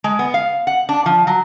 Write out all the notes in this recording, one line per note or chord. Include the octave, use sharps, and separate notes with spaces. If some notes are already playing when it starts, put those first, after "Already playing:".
G#3
B3
F5
F#5
D4
F3
F#3